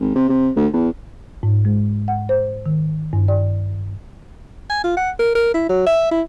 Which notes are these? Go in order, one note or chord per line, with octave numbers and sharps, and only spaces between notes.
G#1
C3
C3
D2
E2
G#2
G#3
F#5
C5
D#3
G2
D5
G#5
F4
F#5
A#4
A#4
E4
F#3
E5
E4